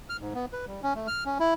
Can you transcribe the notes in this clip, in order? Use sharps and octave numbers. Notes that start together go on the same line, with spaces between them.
F6
G#2
B3
B4
G3
C#4
A3
F6
C#4
E4